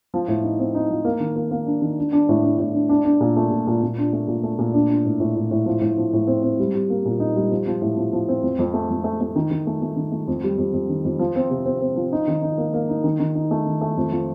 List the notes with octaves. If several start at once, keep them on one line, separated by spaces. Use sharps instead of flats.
F3
A2
D#4
C4
D#4
F3
A#3
D#3
A#3
A#3
D4
D#3
D4
D4
A2
D4
A2
D4
D4
D4
A#2
A3
A#2
A#2
A#2
D4
A3
A#2
A3
A#2
D4
D4
A2
A2
A2
A2
F3
A2
F3
A2
C4
C4
G3
G3
A#3
A#2
D#4
G3
F3
F3
A2
F3
F3
C4
F2
F2
A3
F2
A3
A3
D#3
D#3
A3
A3
D#3
A3
F2
G3
F2
F2
D#3
F2
F3
C4
C3
C4
C4
F3
D#4
D#3
D#4
A#3
A#3
D#4
D#3
D#3
D#4
A3
D#3
A3
F2
F3